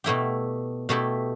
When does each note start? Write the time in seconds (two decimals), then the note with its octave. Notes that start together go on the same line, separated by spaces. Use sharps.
0.04 B2 A3 E4 G4
0.89 B2 A3 E4 G4